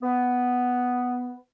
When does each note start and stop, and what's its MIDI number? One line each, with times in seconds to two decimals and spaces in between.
0.03 1.33 59